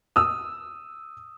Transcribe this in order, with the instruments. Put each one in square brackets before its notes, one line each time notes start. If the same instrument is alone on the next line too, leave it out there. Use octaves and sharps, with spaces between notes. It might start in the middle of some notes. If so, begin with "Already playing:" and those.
[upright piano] D#6 E6